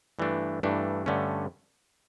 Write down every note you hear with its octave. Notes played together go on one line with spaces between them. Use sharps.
G2 E3 A3 D4
G2 E3 A3 D4
G2 D3 A3 C#4